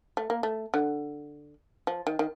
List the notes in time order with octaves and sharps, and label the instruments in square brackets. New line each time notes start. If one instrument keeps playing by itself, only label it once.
[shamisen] A3
A#3
A3
D3
F3
D#3
D#3